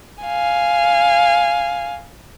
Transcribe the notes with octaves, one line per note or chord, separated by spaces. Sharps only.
F5 G#5